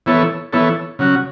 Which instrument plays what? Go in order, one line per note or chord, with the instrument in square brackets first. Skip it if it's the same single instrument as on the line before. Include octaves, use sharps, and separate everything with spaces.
[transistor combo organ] E3 B3 E4 A4 C#5
E3 B3 E4 A4 C#5
C#3 F#3 C#4 F#4